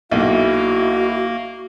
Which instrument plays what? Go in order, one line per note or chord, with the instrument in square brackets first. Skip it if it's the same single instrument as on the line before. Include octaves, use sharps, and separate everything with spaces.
[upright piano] B1 A#2 [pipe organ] A#3 [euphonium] E4 [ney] F#4